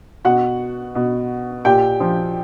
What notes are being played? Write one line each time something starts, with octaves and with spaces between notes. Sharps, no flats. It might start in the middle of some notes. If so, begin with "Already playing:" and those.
B2 F#4 F#5
B2
A#2 G4 G5
F3